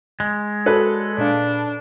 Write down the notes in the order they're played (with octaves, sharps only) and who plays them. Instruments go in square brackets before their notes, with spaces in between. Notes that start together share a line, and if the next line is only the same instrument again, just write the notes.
[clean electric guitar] G#3
[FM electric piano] F#4 C#5 D5 [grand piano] A4 B4
[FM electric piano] A#2 G#4 F5 [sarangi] D4